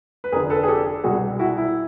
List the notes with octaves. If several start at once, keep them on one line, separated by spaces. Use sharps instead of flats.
B4
F1 F2 D3 G#4 A#4
A4 B4
G#4
G4 A4
C2 B2 G3 F#4 G#4
E4 F#4
E4